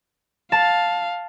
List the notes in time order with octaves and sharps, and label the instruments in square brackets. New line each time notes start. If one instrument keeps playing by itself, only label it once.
[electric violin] F5 [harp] A5